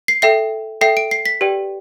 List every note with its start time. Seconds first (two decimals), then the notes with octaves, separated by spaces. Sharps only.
0.08 C7
0.22 A4 E5 G5 C7
0.81 A4 E5 G5 C7
0.97 D7
1.11 C7
1.26 B6
1.41 G4 B4 D5 G5